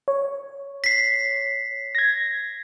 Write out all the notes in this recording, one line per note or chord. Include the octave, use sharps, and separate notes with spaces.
C#5
B6 C7
G#6 A#6